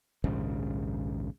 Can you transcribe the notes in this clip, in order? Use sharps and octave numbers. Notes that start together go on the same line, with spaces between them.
A#1 D#2 G#2 C#3